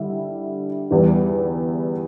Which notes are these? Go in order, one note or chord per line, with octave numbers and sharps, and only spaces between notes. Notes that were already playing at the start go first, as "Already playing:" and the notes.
Already playing: D3 G3 E4
E2 E3 G3